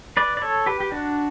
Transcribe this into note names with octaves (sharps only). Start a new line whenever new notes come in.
B4 D5
D5
A4 C#5
G4 B4
G4
D4 F#4